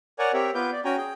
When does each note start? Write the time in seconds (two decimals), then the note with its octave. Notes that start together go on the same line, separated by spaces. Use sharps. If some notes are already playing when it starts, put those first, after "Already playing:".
0.19 A#4 C#5 D5 F#5 G#5
0.33 C4 G4 A#4 C#5 E5
0.55 B3 F4 B4 D6 G6
0.72 D5
0.85 C#4 F#4 G5 G#5 A#5
0.97 G#4 G5